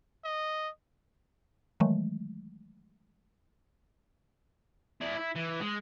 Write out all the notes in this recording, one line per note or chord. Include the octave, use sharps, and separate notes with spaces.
D#5
D#3 E3 F#3 G#3 A3
E4 D5
E4
E3
G#3